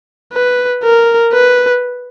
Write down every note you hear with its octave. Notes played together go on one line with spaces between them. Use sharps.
B4
A#4
B4